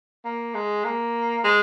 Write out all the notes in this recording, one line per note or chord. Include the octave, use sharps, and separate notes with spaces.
A#3
G#3
A#3
G#3